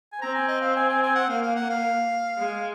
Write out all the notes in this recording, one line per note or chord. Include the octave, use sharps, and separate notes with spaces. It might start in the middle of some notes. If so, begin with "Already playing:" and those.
G#5
C4 A#5
G#5
D#5
F5
G#5
G#5
G#5
F#5
A#3 F5
F5
F#5
F5
G#3